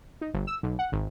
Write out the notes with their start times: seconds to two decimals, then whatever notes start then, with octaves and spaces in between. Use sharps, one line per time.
0.21 D#4
0.34 G1
0.47 E6
0.63 B1
0.79 F#5
0.92 G#1